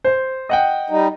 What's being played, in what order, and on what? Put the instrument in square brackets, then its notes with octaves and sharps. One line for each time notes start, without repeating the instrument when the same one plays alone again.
[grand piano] C5
D#5 F#5 G5
[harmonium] G3 D#4